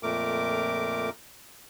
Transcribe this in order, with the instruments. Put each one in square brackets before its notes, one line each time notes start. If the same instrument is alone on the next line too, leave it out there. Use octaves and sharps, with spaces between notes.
[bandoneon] F2 A#2 A3 A#4 D6